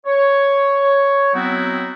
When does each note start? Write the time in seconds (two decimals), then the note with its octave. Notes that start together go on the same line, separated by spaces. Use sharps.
0.05 C#5
1.33 F#3 B3 C4 D#4 E4 F#4